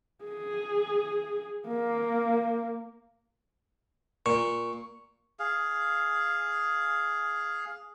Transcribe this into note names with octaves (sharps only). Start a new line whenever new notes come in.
G#4
A#3
A#2 C#6
G#4 F5